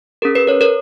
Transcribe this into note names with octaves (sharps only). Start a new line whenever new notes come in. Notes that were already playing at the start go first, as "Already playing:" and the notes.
C#4 G#4 A#4
B4
A#4 C#5
A#4 C#5